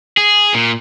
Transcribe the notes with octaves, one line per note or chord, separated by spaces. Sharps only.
G#4
A#2